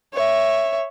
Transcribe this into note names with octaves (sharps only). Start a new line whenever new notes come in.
C#5 E5